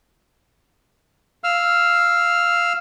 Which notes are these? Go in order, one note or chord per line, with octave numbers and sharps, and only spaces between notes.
F5 E6 F6